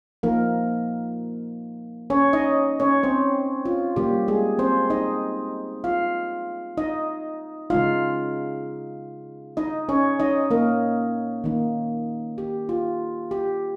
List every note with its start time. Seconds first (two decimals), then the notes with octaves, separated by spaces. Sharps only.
0.23 F3 A#3 D#4 A#4
2.10 C#4 C#5
2.33 D#4 D#5
2.80 C#4 C#5
3.03 C4 C5
3.66 F4
3.96 C3 G3 A#3 G4
4.28 G#3 G#4
4.59 C4 C5
4.90 D#4 D#5
5.84 F4 F5
6.77 D#4 D#5
7.70 C#3 G#3 D#4 F4 F5
9.57 D#4 D#5
9.89 C#4 C#5
10.20 D#4 D#5
10.50 A#3 A#4
11.44 D#3 A#3 D#4
12.38 G4
12.69 F4
13.31 G4